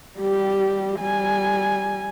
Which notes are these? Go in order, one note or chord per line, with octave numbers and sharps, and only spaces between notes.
G3 G4
G3 G#5